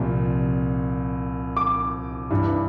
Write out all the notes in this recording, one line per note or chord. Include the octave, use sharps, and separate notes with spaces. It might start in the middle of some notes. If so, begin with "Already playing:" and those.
Already playing: C2 A#2 F3
D6
G2 E3